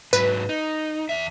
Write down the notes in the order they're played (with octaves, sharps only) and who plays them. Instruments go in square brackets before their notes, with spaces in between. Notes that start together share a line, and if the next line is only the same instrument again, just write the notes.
[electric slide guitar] G#2 F#3 [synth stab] B4
[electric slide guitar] D#4
E2 E5